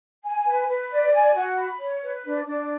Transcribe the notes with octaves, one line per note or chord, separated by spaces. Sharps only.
G#5
B4
B4
D5
G#5
F#4
B5
C#5
B4
D4
D4